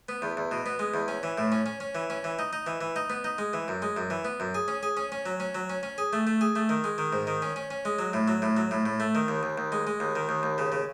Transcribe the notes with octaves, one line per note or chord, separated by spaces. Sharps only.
B3
E2
E2
B2
B3
G#3
E2
C#4
E3
A2
C#4
C#4
C#4
E3
C#4
E3
D#4
D#4
E3
E3
D#4
B3
D#4
G#3
E3
F#2
G#3
F#2
E3
B3
F#2
G#4
C#4
G#4
C#4
C#4
F#3
C#4
F#3
C#4
C#4
G#4
A3
A3
G#4
A3
D#3
G#3
D#3
G#2
D#3
C#4
C#4
C#4
G#3
F#3
A2
F#3
A2
F#3
A2
A2
A3
D#3
D#2
D#2
D#2
G#3
G#3
D#2
D#3
D#2
D#2
C#3
C#3